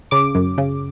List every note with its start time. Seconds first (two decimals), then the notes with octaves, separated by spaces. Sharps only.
0.11 C#3 D6
0.35 F#2
0.58 C#3